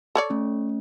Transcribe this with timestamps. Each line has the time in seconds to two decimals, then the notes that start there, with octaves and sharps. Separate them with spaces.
0.15 A4 C#5 D5
0.30 A3 C#4